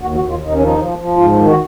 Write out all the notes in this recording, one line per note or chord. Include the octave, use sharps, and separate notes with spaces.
D#2 F#4
F#4
D#2
F4
D#2 D#4
C#4
F3 D#4
F3
F3
G#2 F4
D#3
F#4